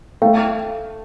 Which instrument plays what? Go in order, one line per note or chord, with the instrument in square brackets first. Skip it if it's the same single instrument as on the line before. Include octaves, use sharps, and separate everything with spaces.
[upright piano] A3 [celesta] F5 G5